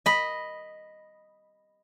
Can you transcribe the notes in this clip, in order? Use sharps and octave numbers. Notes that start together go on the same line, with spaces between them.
D#5 B5